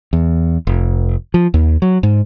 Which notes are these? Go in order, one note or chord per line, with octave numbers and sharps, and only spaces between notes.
E2
F1
F3
D#2
F#3
G#2